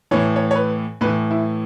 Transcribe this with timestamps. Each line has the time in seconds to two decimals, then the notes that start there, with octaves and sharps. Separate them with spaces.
0.11 A2 E3 C#5
0.36 C#5
0.51 C#5
0.55 B4
1.01 A2 E3 B4
1.31 E4